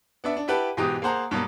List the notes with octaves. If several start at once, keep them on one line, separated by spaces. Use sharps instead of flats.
B3 D4 E5
D4
E4 G4 B4 F#5 G5 A5
G#2 B2 E3 G4 D#6
A#3 G#4 C5 F#5 A#5
G2 B2 F#3 A#3